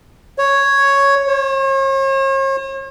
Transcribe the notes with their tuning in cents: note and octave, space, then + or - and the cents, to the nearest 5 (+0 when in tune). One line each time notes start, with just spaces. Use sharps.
C#5 +0
C#5 -45